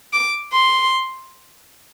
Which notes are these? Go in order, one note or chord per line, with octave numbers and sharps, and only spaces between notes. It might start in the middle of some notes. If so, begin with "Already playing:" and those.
D6
C6